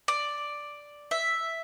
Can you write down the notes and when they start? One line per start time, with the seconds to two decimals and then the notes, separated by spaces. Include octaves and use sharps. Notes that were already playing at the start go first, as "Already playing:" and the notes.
0.08 D5
1.11 E5